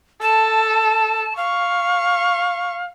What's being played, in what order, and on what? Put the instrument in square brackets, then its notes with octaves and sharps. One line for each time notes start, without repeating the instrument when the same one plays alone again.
[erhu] A4 [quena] A5
[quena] F5 [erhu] C#6